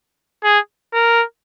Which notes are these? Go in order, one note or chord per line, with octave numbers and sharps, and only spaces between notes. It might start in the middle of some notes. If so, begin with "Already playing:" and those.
G#4
A#4